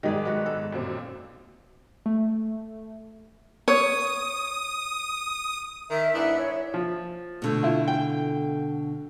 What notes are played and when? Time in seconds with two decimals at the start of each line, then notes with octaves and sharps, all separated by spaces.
0.03 G#2 D#3 G3 G#3 G#4 D5
0.25 B3 F#4
0.46 A4
0.72 F#2 A#2 C4
2.06 A3
3.68 C#5 D#6
5.90 D#3 E5
6.14 G#2 B3 D4 E4
6.38 C#5
6.74 F3
7.42 B2 D3 A3
7.63 E4 F4
7.88 G5